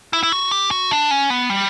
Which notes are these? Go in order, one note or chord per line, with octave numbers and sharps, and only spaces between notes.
E4
E4
F#4
G4
F#4
D4
C#4
B3
G3